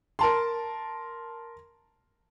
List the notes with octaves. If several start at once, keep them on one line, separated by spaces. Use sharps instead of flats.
A#4 A5 C6